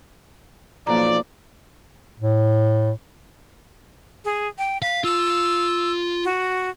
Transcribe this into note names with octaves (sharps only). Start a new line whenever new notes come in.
B1 F3 A#3 D5 A#5
A2
G#4
G5
F5 B6
F4 E6
F#4